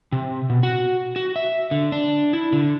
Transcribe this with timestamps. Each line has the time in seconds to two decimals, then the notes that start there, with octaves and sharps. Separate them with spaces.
0.12 C3
0.50 B2
0.63 F#4
1.16 F#4
1.36 E5
1.71 D3
1.92 D4
2.33 E4
2.53 D3